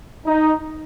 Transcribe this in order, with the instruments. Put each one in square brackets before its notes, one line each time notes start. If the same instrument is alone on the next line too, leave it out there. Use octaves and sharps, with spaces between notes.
[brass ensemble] D#4